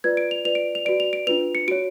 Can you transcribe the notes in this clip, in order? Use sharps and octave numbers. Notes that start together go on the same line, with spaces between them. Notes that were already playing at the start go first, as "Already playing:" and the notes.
F4 B4 D5 G#6
D7
F7
F4 B4 D5 F7
D7
F7
F#4 B4 D5 D7
F7
D7
D4 F4 B4 F7
C#7
F#4 C#5 D7